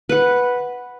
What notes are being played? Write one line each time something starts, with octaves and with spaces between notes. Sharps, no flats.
B4 F#5